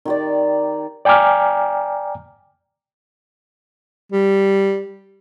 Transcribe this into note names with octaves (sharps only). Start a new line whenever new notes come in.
D#3 G4 D5
D5 G5 G#5 A#5 D6 F6
G3